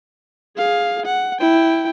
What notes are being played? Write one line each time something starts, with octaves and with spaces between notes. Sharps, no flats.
G#4 F5
F#5
E4 G5